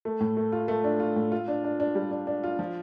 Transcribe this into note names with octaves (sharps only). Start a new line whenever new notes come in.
A3
A2
A3
F4
A3
D4
F4
A2
F4
D4
D4
D4
G3
D4
D4
F4
F3